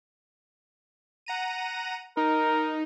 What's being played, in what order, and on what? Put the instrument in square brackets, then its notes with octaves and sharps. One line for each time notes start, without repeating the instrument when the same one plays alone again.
[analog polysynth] F#5 A#5 D#7
[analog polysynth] D#4 [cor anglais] A#4